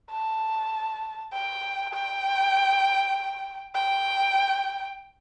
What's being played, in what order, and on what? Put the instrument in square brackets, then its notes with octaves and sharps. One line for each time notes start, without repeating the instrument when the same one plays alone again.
[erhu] A5
G5
G5
G5